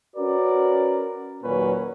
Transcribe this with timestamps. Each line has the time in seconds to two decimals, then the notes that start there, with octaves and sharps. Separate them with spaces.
0.16 C#4 F#4 A#4 B4 D5
1.44 D#2 A#2 F#3 A#3 C#4 B4